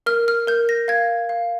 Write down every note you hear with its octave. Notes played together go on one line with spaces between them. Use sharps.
A#4 F6
F6
A#4 G6
A#6
F5 G#6
F5